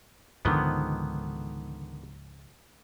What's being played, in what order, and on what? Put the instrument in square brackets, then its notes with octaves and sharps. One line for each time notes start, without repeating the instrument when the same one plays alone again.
[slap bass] C#2 G#2 F3 [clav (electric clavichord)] D3 D#3 B3